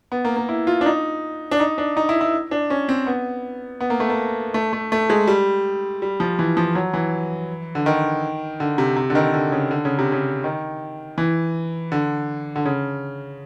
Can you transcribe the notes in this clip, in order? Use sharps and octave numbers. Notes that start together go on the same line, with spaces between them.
B3
A#3
A#3
E4
F4
D4
D#4
D4
D#4
D4
D#4
E4
E4
D4
C#4
C4
B3
B3
A#3
A3
A#3
A3
A3
A3
G#3
G3
G3
F3
E3
F3
F#3
E3
D3
D#3
D3
C3
C3
D3
D#3
D3
C#3
D3
C#3
C3
C#3
D#3
E3
D3
D3
C#3